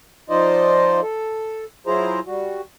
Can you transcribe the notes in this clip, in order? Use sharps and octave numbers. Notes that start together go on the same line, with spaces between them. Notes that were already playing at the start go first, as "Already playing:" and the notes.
F3 D#4 F4 C5 D5 D#5
A4
F#3 E4 F4 G#4 C5 A#5
G3 F#4